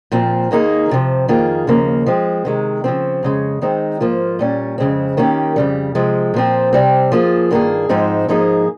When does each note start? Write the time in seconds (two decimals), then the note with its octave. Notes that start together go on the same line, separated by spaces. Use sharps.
0.12 A#2 F3 C4
0.51 D#2 D#3 A#3 D#4 G#4
0.89 F2 C3 F3
1.28 F2 D#3 A#3 F4 G#4
1.67 D#2 C#3 F3 A#3
2.06 F3 G#3 C4
2.45 C3 D#3 G#3
2.84 C#3 F3 C4
3.23 F2 C#3 G#3
3.62 D#3 G#3 C4 D#4
4.00 G#2 F3 A#3 F4
4.39 A#2 G3 C#4
4.78 F2 C#3 G#3 C4
5.17 D#3 A#3 C#4 G4
5.56 F2 C#3 G3
5.95 C3 F3 G#3
6.34 A#2 F3 C4
6.73 C3 G3 C4
7.12 F3 A#3 F4 G#4
7.51 G2 D#3 A#3 F4 G#4
7.89 G#2 F3 G#3 C4 D#4
8.29 G#2 F3 A#3 D#4 G#4